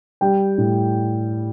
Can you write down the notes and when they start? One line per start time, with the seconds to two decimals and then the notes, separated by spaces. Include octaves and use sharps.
0.21 G3 G5
0.58 A2